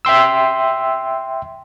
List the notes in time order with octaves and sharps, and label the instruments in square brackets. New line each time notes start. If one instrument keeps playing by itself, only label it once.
[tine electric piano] E5 G5 C6 E6